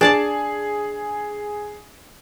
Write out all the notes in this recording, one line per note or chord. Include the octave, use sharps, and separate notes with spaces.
D4 G#4 D5 A5